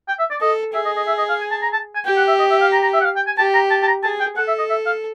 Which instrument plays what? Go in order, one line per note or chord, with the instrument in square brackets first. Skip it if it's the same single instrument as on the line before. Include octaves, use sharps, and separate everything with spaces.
[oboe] G5
E5
D5
[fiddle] A4 [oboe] D#5
[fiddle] G#4 [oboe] E5
[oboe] D#5
D#5
E5
D#5
F5
G#5
A5
A#5
A5
G#5
[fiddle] G4 [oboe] G5
[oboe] F#5
E5
D#5
E5
F5
A#5
A#5
E5
F#5
F5
G5
G#5
[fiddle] G4 [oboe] A5
[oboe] A#5
A5
A5
A#5
[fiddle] G#4 [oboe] A5
[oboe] G5
[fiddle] A4 [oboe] F#5
[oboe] E5
D#5
E5
F5